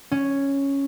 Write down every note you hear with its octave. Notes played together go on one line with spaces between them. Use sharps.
C#4